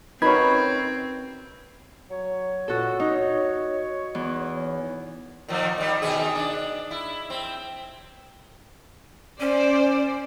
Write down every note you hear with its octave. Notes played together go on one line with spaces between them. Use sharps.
C4 C#4 D#4 F#4 A#4 B4 C#5 G#6
F#3 C#5
C#2 A#2 F#4 A4
D#4 C#5
E2
A#2 D#3 F3
D#3 G3
B2 D#3 G#4
D4
E4
C4
C#4 C5 D5